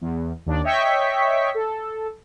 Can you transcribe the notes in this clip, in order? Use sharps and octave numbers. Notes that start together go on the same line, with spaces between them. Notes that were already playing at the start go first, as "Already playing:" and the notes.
E2
D#2 D4 D5
C#5 D#5 E5 G5 C#6 B6
A4